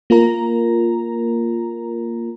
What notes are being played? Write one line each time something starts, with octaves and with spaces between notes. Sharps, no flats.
A#3 F4 A#4 A#5